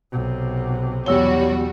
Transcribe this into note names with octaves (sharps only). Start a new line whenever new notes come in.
B1 C3
E2 F#3 G3 F#4 C#5 E6 G7